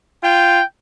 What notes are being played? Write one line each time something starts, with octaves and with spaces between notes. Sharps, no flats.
F4 G5